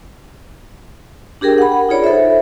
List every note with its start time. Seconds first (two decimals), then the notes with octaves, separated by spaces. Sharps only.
1.41 D4 G4 G#4 A#4 G5
1.58 F#5 B5
1.72 F#5
1.89 D#4 F4 G#4 C#5 D5
2.04 A4 C5 E5